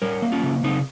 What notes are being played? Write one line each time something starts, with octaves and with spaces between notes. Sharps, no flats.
G3 A#4 C#5
A#3
C#4 F4
C#3
C#3 C4 D#4